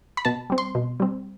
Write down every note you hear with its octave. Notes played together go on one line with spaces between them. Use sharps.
B5
B2 A5
G3 C4
C6
B2
G3 C4